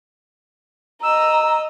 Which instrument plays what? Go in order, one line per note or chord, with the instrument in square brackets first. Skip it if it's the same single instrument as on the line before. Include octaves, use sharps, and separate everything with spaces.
[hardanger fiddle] D#5 [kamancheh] A#5 [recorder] E6